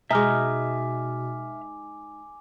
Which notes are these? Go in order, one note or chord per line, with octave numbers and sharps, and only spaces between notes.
B2 G#3 D#4 E5 G#5 D6 F6